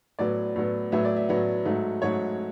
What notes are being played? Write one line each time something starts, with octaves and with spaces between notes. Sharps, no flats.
A2 F#3 B3 D5
A2 F#3 B3
A2 F#3 B3 E5
D5
E5
A2 F#3 B3
G#2 F#3 A3
G#2 F#3 A3 C#5